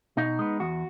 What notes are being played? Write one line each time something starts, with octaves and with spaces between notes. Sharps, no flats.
B2 D#4
G#3 B3
E2 F#4